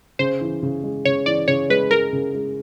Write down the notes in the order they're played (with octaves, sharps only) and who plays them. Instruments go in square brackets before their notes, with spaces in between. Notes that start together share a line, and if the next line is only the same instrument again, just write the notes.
[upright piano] C#3 [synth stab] C5
[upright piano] E3
C#3
G#3
[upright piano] C#3 [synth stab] C#5
[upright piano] E3 [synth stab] D5
[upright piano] C#3 [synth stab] C#5
[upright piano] G#3 [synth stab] B4
[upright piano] G#3 [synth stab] A#4
[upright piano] C#3
G#3